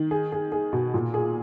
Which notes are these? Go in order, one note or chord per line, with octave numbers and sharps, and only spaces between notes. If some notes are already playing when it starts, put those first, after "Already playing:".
Already playing: D#3
G#4
G#4
G#4
B2
A#2
G#4